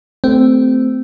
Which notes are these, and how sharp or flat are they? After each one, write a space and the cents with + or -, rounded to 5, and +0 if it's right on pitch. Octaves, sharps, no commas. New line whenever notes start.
A3 +0 C4 -20 G4 +0